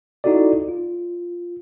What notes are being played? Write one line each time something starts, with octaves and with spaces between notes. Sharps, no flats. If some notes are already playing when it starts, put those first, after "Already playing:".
D#4 E4 F#4 A4 D5
F4